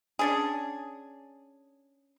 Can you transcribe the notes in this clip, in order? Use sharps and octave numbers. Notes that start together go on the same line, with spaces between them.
C#4 D4 G#4